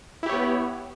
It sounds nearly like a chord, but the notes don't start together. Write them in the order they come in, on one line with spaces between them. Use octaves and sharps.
E4 G4 C#5 B3